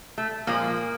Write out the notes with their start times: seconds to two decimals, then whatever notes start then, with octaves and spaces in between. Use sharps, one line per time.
0.18 A3
0.47 A#2 F3 G#3 A#3